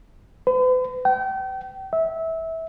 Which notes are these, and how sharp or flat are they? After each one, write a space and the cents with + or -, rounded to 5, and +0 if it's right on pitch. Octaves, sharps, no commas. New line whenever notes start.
B4 +45
G5 -35
E5 -20